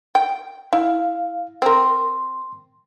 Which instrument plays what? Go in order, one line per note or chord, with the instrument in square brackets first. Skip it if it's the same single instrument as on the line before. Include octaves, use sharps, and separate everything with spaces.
[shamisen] G5
[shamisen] E4 [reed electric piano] F5
[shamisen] C4 A#4 [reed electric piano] C6